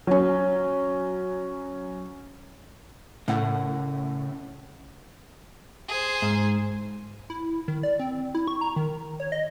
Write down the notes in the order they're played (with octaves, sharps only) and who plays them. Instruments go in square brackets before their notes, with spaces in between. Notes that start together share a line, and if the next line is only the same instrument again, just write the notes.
[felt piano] F#3 C#4
[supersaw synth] A2 [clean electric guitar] C#3 F#5
[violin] G#4 C5
[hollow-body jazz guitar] G#2
[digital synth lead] E4
D#3
D5
C4
E4
C#6
A#5
D#3
C#5
D#5